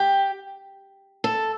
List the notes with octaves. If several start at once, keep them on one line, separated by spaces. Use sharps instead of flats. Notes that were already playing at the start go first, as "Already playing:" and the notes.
Already playing: G4
A4